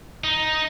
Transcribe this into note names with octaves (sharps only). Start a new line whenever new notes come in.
D#4